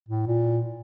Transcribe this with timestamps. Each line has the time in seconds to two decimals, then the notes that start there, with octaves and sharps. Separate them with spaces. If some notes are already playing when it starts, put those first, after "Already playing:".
0.08 A2
0.27 A#2